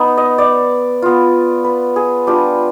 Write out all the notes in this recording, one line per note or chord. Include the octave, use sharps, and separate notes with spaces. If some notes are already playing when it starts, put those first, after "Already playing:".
Already playing: B3 D#4
D#5
D5
B3 F4
B4
G#4
G3 D4 F4 G4